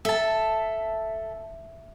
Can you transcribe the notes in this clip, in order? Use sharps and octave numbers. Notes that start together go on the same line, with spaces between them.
A4 E5 A5